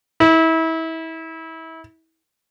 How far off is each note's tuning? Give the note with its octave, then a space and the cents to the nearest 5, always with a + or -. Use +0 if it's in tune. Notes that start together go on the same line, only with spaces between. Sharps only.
E4 -30